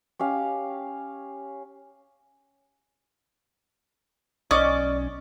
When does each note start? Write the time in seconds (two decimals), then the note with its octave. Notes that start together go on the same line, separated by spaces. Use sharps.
0.19 C#4 G4 F5
4.51 B1 C#4 D5 D#5